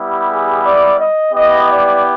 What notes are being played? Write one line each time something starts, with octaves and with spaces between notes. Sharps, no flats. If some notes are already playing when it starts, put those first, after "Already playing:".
Already playing: G3 B3 E4 G4
G#4
D5
D#5
B3 E4 G4 D#5
D5